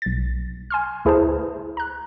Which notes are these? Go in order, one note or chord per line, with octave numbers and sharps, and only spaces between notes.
B1 A6
G#5 C6 F6
D2 E4 G#4 B4 C5 A5
A#5 F#6